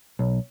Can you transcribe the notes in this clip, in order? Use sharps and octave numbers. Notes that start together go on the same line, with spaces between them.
B1